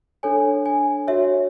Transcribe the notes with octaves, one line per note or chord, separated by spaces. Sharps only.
D4 A4 C#5 G#5
G#5
F#4 C#5 E5